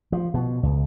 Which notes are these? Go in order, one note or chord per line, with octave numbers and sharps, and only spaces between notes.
F3
B2
C#2